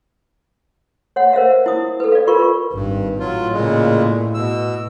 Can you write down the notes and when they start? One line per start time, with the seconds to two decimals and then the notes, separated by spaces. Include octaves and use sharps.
1.16 C#5 F#5
1.33 A#4 C5 E5 F5
1.66 E4 D#6
2.00 A4 B4
2.12 D5 F5
2.27 F4 A#4 B4 C#6
2.73 G#1 G2
3.19 A2 F#3 F4
3.52 A#2 C#3 G#3
4.34 B2 E6